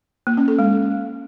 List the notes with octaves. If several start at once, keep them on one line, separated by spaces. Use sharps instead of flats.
A#3
C#4
A4
G#3